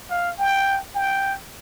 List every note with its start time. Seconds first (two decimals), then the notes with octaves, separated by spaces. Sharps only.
0.11 F5
0.39 G5
0.95 G5